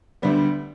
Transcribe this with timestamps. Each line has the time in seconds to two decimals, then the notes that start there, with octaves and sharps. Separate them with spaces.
0.22 D2 D3 G3 B3